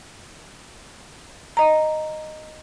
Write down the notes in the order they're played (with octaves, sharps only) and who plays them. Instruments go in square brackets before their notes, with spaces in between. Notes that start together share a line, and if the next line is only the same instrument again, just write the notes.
[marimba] D#5 A#5